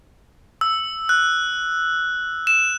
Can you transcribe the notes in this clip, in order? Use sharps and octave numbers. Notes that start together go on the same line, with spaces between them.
E6
F#6
E7